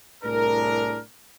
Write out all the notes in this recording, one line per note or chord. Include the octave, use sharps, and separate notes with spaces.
C2 A2 D4 G#4 A#4